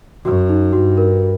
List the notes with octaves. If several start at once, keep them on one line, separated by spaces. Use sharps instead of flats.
F#2 F#4
D#4
G2 F#4
A#4